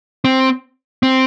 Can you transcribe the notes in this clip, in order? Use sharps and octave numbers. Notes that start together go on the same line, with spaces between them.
C4
C4